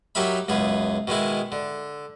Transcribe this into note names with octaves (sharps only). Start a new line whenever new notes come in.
F#3 D#4 G4 A#4 E5 B5
C#2 F#2 B3 G#4
B2 D#3 G#3 E4
D3